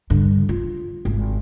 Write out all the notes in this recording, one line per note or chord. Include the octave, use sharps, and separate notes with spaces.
G2 D3
F4
G#1